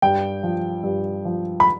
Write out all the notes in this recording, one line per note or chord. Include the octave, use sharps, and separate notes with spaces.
G2 G5
F3
G2
F3
B5